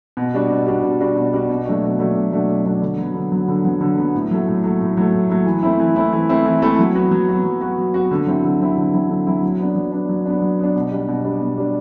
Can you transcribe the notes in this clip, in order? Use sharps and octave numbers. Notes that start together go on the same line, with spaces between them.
B2
G3 D4 F#4
B2
G3 D4 F#4
B2
G3 D4 F#4
B2
G3 D4 F#4
B2
F#3 A3 D4 F#4
B2
F#3 A3 D4 F#4
B2
F#3 A3 D4 F#4
B2
F#3 A3 D4 F#4
D3
F#3 B3
D3
F#3 B3
D3
F#3 B3
D3
F#3 B3
A2
F#3 A3
A2
F#3 A3
A2
F#3 A3
A2
F#3 A3
E3
A3 C4 E4
E3
A3 C4 E4
E3
A3 C4 E4
E3
A3 C4 E4
F#3
B3 F#4
F#3
B3 F#4
F#3
B3 F#4
F#3
B3 F#4
D3
F#3 C4 E4
D3
F#3 C4 E4
D3
F#3 C4 E4
D3
F#3 C4 E4
F#3
B3 D4
F#3
B3 D4
F#3
B3 D4
F#3
B3 D4
B2
G3 D4
B2
G3 D4
B2
G3 D4